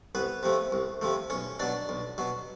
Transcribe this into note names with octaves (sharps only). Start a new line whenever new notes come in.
C2 B3 B4
C3 F3 A3
C2
C3 F3 A3
B1 C#4 C#5
B2 F#3 D4 D5
B1
B2 F#3